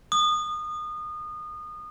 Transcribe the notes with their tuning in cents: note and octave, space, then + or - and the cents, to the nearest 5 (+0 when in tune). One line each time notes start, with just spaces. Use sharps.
D#6 -30